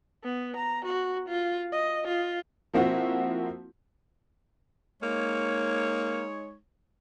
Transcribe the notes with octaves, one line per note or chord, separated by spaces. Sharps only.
B3
A#5
F#4
F4
D#5
F4
F3 A#3 C4 E4 F#4
G#3 A#3 D#4 C#5